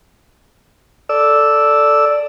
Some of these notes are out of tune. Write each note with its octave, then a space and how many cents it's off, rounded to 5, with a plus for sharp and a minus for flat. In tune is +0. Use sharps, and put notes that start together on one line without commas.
A4 +0 D5 +0 E6 +0